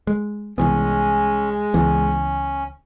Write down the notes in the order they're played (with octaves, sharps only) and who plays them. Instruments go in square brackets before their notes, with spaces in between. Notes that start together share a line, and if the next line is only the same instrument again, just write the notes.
[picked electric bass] G#3
[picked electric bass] C2 E3 B3 [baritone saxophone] G#3 [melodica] C#4
[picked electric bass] C#2 E3 B3 [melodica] C#4